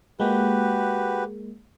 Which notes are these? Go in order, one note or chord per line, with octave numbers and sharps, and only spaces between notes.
G#3 A#3 F#4 G4 B4